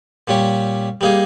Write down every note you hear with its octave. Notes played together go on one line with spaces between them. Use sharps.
A#2 G3 C#4 G4
G3 A#3 D#4 G#4